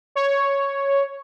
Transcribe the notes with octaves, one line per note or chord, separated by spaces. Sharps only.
C#5